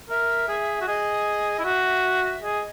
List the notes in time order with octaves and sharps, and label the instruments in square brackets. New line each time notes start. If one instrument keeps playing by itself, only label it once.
[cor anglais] A#4 [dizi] E5
[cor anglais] G#4
F#4
[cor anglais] G#4 [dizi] D#5
[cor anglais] E4
[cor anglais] F#4 [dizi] E5
[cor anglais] G#4 [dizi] D#5